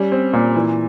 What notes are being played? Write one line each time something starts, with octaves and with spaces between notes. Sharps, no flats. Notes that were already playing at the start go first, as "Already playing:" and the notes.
Already playing: G3 C#4
C4
A#2
E3